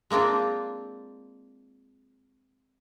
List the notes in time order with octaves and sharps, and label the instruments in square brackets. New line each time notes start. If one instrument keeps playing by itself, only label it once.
[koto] G#3 A#3 C4 D4 F4